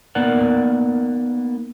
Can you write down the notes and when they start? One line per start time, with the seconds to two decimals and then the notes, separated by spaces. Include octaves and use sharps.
0.15 A#3 B3 D#4 A#4 D5 F#5